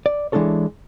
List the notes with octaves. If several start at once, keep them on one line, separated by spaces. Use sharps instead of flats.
D5
E3 G#3 D4 E4 A4 C#5